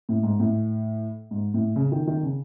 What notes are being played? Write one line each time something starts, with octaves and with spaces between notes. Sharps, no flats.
A2
G#2
A2
G#2
A2
C#3
D#3
D#3
C#3